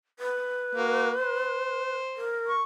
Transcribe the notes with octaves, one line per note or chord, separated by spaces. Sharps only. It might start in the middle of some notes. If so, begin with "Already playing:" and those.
B4
A#3 F#4
C5
A#4
C#6